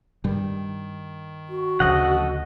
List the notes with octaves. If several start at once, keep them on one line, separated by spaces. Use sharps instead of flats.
G2 D#3 G3
F#4
D2 C#3 F3 A4 D#5 F#5